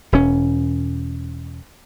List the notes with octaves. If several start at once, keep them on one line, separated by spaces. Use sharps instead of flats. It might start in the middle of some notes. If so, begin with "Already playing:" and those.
E1 C#4